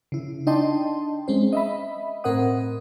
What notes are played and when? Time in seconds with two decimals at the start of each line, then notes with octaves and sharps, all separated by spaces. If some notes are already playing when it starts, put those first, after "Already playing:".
0.12 C#3 E4
0.47 D4 D#4 D#5 G5 A5 C6
1.28 G#3 C4 C#4 C5
1.53 D#5 E5 B5
2.24 A2 C4 A#4 C5 F#5 D#6